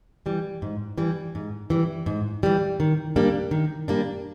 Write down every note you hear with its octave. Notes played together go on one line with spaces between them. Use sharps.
E3 G3
G#2
E3 G3
G#2
E3 G3
G#2
E3 G3
D#3
G3 A#3 D4
D#3
G3 A#3 D4